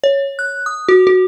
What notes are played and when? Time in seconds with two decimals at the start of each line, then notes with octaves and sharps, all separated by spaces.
0.04 C#5
0.39 F#6
0.66 D#6
0.89 F#4
1.07 F#4